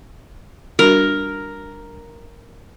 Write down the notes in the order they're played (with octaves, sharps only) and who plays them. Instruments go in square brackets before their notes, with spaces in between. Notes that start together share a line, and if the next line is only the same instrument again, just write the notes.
[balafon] G3 D4 F#4 [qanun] A#4